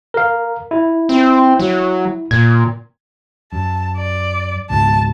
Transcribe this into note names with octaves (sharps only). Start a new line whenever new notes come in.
A#4 F5
E4
C4
F#3
A#2 G#6
F#2 A5
D5
C#2 G#2 B2 A5